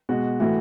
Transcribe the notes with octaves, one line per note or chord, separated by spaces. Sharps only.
B2 G#3 F#4
A2 E3 A3 F#4